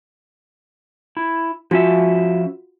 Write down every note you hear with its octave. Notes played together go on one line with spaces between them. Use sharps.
E4
F3 C#4 F4 F#4 E5